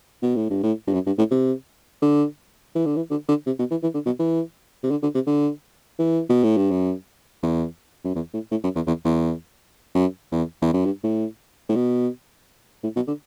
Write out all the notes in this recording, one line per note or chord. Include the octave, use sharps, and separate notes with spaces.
B2
A2
G2
A2
G2
F#2
G2
A2
C3
D3
E3
D3
E3
D3
D3
C3
B2
E3
E3
D3
B2
E3
C3
D3
D3
C3
D3
E3
B2
A2
G2
F#2
E2
F#2
E2
A2
A2
F#2
E2
E2
E2
F#2
E2
E2
F#2
G2
A2
A2
B2
A2
B2
D3